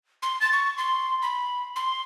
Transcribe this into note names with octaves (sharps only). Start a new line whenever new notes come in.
C6
A6
C#6
C6
B5
C6